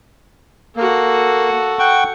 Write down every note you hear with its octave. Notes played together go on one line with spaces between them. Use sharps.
A#3 F#4 A4
F#5 G5 C#6